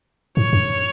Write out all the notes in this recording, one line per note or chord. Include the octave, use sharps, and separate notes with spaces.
G#2 C#5
F#2